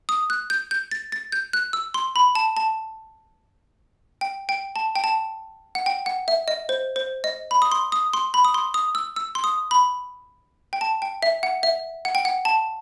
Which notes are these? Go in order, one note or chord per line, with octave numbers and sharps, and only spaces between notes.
D#6
F#6
G6
G6
A6
A6
G6
F#6
E6
C6
B5
A5
A5
G5
G5
A5
G5
A5
F#5
G5
F#5
E5
D#5
C5
C5
D#5
B5
D#6
C6
D#6
C6
B5
D#6
C6
D#6
E6
E6
C6
D#6
B5
G5
A5
G5
E5
F#5
E5
F#5
G5
F#5
A5